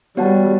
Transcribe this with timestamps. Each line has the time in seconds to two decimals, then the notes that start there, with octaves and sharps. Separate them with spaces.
0.17 G3 B3 F#4 C#5 F#5 A5